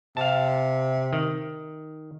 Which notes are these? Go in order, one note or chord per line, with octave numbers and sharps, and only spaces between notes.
C3 F5 A5
D#3